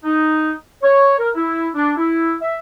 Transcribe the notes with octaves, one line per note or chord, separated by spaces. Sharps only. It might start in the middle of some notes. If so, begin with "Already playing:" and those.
D#4
C#5
A#4
E4
D4
E4
E5